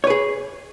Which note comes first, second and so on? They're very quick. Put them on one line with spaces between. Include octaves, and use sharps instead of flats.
C#5 B4 G#4